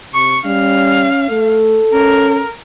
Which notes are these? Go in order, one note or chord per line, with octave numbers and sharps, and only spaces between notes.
C3 C#6
G3 C#4 F5
A3 A4
C#4 A#4